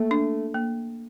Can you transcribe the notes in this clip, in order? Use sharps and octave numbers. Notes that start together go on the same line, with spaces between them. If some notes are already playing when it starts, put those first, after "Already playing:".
Already playing: A3 A#3
D4
A#3